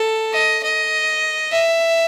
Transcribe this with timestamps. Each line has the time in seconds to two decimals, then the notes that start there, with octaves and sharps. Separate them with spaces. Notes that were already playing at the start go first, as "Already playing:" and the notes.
Already playing: A4
0.33 D#5
0.63 D#5
1.52 E5